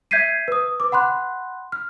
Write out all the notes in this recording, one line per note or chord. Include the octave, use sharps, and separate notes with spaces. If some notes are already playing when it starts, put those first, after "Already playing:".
E5 G6 G#6 B6 C7 D#7
B4 D#6
B4 D6
F#5 B5 C6 F#6
F6